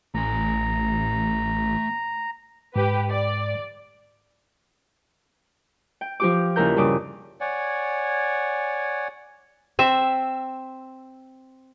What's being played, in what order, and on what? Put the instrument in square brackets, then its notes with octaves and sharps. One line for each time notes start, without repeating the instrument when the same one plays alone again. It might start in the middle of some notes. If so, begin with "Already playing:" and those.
[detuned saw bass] A1 [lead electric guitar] A3 G#5 [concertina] A#5
[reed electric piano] G#2 [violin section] G4 B4
[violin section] D5
[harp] G5
F3 G4 D6
D#2 C#3 E4 A#4 A#5 G6
G2 C#3 D6 D#6
[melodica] C#5 D5 F#5 G#5
[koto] C4 E5